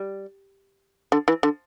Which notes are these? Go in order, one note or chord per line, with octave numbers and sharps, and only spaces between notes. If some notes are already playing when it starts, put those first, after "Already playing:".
Already playing: G3
D3
E3
D3